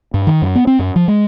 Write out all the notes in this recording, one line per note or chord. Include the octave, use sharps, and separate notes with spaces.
G2
D#3
F#2
B3
C4
F#2
F3
G#3